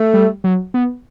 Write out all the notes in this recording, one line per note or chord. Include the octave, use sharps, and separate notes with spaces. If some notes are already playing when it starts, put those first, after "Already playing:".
Already playing: A3
G3
F#3
B3